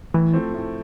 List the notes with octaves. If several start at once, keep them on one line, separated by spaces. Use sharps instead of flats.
A2 E3
F3 A3 C4
A2